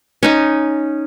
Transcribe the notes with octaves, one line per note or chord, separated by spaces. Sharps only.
C#4 D#4